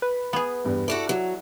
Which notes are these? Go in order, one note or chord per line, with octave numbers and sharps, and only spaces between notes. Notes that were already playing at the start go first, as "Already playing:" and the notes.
B4
B3 G#4
E2 G2
E4 F#4 A4 D5
F#3